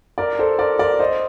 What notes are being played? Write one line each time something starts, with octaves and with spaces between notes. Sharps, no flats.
A#4 D5
A4 C5
A#4 D5
A#4 D5
C5 D#5